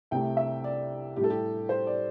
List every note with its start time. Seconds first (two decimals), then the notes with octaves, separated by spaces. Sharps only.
0.11 C2 C3 A3 G5
0.37 E5
0.64 D5
1.16 A2 G4
1.19 G3 A4
1.30 G4
1.69 C5
1.87 D5